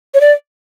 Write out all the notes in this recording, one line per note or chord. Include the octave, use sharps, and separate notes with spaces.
C#5
D5